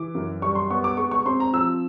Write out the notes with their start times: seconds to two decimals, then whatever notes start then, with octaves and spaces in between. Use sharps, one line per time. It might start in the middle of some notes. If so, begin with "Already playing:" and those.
Already playing: E3 D6
0.15 F#2
0.42 G3 C#6
0.55 C6
0.70 B3 C#6
0.84 D6
0.97 G#3 C#6
1.11 C#6
1.25 C4 C6
1.40 A#5
1.53 F3 E6